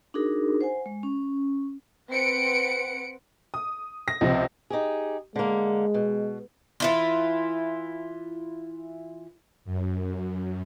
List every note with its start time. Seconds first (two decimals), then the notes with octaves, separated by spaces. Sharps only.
0.14 D4 D#4 F#4 G#4 A#4
0.61 C5 F#5 G#5
0.86 G#3
1.03 C#4
2.10 C4 B4 F#5 C#7 D7
3.54 D#6
4.08 A#6
4.21 C#2 C3 F3 C4
4.70 D#4 G4 G#4
5.36 D3 G#3 A#3
5.94 B2
6.80 E3 E4 F4
9.65 F#2